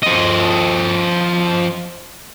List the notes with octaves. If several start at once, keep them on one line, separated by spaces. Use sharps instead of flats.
F3 D#5